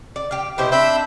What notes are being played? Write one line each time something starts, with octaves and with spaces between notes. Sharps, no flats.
D5
G4 F5
B2 E4 G4 C5
C4 D4 E5 B5 G6